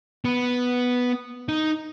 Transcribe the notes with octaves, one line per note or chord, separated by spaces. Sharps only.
B3
D#4